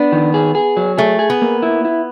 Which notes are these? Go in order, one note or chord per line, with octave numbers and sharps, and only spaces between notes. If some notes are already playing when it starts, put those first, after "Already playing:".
Already playing: B3 D4
D#3
G#4
G#4
F#3
A3 G#4
G#4
B3
A#3
E4
E4